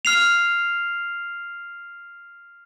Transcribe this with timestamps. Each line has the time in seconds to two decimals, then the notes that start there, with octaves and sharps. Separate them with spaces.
0.05 F6 C7 F7